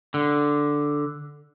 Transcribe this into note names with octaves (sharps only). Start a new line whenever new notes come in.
D3